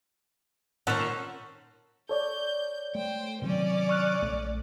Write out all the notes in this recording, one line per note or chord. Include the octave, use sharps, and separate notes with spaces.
A#2 D#3 C#4 C5 F#5 A5 E6
A4 C#5 D5 G6
A3 C5 G5
C3 D#3 F#3 C#4 D5
C#6 F6 F#6
A#1 A3